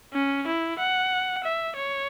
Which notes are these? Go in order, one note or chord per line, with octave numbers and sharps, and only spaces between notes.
C#4
E4
F#5
E5
C#5